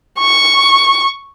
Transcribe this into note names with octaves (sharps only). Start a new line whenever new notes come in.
C#6